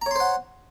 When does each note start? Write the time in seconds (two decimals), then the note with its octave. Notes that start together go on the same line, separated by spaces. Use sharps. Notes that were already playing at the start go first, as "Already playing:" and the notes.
0.02 A#5
0.06 C#5
0.11 C6
0.16 C5
0.20 F#5